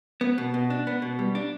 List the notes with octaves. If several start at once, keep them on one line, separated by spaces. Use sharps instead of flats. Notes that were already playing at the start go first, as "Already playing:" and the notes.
B3
B2
B2
D4
B3
B2
G3
D4